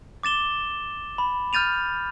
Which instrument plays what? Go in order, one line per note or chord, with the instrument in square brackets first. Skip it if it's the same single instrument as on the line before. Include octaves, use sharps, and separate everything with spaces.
[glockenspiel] D6 A6 E7 G7
B5
F6 G6 A6 D#7 F7